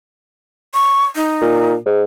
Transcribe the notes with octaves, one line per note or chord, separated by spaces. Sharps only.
C#6
D#4
A#2
G#2